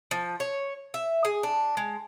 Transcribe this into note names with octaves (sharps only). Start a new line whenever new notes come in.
F3
C#5
E5
G#4
D4
G#3